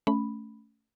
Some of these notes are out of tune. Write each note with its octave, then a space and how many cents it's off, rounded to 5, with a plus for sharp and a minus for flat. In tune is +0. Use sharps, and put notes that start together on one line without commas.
A3 +0 C#4 +15 B5 +0